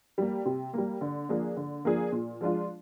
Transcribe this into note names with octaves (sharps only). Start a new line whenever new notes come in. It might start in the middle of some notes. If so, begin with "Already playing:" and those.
G3 A#3
C3
G3 A#3
D3
F3 A#3 D4 G#4
D3
F3 A#3 D4 G#4
A#2
F3 G#3 D4 F4